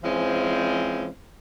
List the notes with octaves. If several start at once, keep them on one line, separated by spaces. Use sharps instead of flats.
E3 F3 G#3 C4 C#4